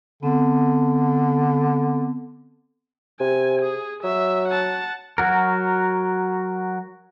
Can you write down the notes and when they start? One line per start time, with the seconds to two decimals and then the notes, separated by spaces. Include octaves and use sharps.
0.23 D3 B3 C4
3.20 C3 G#5
3.62 G#4
4.04 F#3 E5
4.49 F#5 A5
5.18 F#3 F#4 A#4